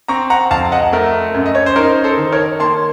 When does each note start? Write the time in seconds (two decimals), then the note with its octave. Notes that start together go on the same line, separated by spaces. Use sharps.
0.08 C4 A#5 C#6
0.30 F#5 A#5
0.51 F2 F5 A5
0.72 D#5 F#5
0.93 A3 A#4
1.34 F#2
1.46 D#5
1.55 C#5
1.66 C5
1.76 D#4 A#4
2.04 A4 C5
2.17 D#3
2.32 A#4 C#5
2.60 A#3 A5 C6